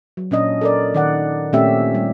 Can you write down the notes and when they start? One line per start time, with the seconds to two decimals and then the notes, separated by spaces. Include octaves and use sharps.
0.17 F#3
0.31 A#2 C#4 D4 D#5
0.61 A4 A#4 D5
0.94 D#3 D5 F#5
1.53 A#2 A3 C4 C#4 G4 E5
1.94 G3